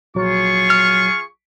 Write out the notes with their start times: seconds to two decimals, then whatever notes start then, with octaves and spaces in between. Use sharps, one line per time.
0.15 A#1 F#3 F4 G#4 C#6
0.70 F6